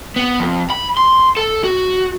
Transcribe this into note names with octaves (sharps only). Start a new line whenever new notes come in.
B3
F2
B5
C6
A4
F#4